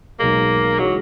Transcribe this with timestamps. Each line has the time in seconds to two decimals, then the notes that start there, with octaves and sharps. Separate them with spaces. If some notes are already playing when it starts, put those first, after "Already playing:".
0.19 B1 B2 G#3 A#3
0.79 C#3 E3 F#3 G#3 C#4